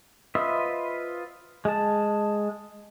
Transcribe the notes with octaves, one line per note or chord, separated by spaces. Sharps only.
F4 B4 C5 D#5 E5
G#3 A5